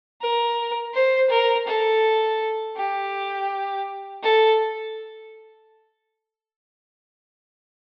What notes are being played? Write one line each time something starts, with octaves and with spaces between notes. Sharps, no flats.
A#4
C5
A#4
A4
G4
A4